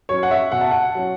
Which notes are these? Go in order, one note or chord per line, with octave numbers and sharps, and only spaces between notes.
F#3 C#4 C#5
F#5
E5
B2 F#5
A5
F#5
F#3 C#4